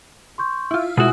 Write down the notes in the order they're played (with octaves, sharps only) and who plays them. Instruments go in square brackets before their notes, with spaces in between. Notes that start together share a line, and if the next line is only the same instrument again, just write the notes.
[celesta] C6 C#6 G6
[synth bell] E4 F4
[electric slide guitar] B2 F#4 [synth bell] G#3 E4 [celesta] F#5 D#6 F#6